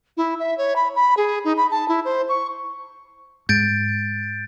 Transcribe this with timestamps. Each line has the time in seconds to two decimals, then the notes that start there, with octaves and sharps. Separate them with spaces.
0.17 E4
0.39 E5
0.58 C#5
0.76 B5
0.96 B5
1.17 G#4
1.44 D#4
1.57 B5
1.71 A5
1.88 E4
2.05 C5
2.29 C#6
3.49 G#2 G6 A6 D7